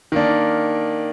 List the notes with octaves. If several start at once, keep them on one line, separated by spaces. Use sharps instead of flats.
D#3 A#3 D4